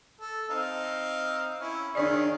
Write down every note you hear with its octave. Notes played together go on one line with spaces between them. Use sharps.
A4
C4 D#4 F5
C#4 E4
D#3 D4 G#4 C#5 D5 F5